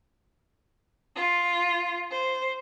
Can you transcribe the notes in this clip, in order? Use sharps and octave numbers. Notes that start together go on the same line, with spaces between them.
F4
C5